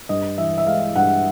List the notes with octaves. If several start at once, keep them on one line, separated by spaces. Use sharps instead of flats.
G2 D#5
E3 E5
E5
G#3 F5
G2 F#5